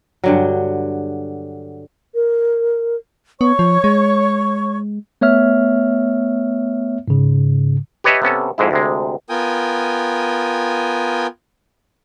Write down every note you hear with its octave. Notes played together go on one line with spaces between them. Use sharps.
G2 D3 F#3
A#4
B3 C#5 C#6
F3
G#3
A3 B3 C#5 E5 F6
G#2 C#3
G4 B4 C#5 D#5 E5 A5
C3 B3 C#4 A4
F2 G#2 G#3 E4
D2 C3 G#3
B3 F4 A#4 G5 G#5 D#6